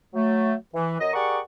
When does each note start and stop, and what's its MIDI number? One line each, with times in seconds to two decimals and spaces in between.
0.14 0.54 54
0.14 0.54 57
0.74 0.98 52
1.00 1.13 42
1.00 1.13 75
1.14 1.39 67
1.14 1.39 68
1.14 1.39 70
1.14 1.39 74
1.14 1.39 78
1.14 1.39 85